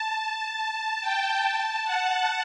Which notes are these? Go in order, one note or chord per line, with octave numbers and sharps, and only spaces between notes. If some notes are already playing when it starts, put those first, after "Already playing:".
Already playing: A5
A5
G5
A5
F#5